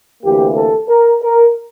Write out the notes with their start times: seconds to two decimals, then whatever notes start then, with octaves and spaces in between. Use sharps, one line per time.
0.23 D2 C3 E3 A#3 G4
0.56 A4
0.89 A#4
1.22 A#4